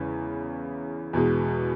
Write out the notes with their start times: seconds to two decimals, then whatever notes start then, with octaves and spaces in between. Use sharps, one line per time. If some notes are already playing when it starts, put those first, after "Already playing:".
Already playing: E2 C#3 G#3 C#4
1.13 E2 B2 G#3